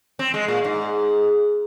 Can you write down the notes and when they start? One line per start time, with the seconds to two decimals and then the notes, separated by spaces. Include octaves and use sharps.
0.19 C4
0.34 G#3
0.48 A#2
0.64 G#2